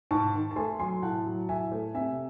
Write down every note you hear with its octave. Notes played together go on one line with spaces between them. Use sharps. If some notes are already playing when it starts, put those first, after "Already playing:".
G#2 A5 C#6
D#3
A5
A3 G#5 C6
F#3 G#5 C6
A2 F#5 A5
F#3
A2 E5 G#5
A3
C3 E5 G#5